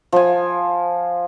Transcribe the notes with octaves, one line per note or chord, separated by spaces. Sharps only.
F3 G#5